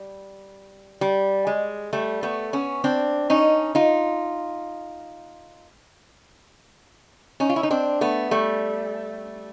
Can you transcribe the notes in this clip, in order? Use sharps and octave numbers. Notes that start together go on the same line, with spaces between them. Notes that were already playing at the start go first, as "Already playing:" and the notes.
Already playing: G3
G3
G#3
G3 A3
A3 B3
B3 C#4
C4 D4
C#4 D#4
D#4 F4
C#4 D#4
F4
E4
D#4
C4 D4
A3 B3
G3 A3